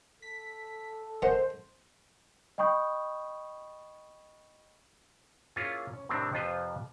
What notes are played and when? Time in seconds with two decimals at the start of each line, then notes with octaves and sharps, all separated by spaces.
0.22 A4 B6
1.22 D#3 C#4 C5 F#5
2.58 D#5 G5 B5 C#6 D#6 G6
5.56 A#3 C#4 E4 F4 G#4
5.93 C#4
6.09 A2 C3 D#3 C4 D4
6.32 F2 C3 F3 F4 B4 C5